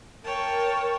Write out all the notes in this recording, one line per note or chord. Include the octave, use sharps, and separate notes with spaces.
A#4 C#5 G5 A5